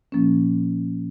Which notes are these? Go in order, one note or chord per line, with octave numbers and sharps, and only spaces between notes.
A#2 F3 A#3 C#4